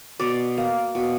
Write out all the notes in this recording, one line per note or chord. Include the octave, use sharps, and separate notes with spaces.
B2 D5
A#3
B2